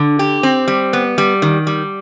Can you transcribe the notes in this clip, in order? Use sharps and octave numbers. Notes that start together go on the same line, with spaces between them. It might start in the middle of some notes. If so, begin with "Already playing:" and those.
Already playing: D3
G4
C4
G3
B3
G3
D#3
G3